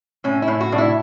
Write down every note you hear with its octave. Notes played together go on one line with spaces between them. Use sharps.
A2 C#4
E4
A2
F#4
A2 D4
E4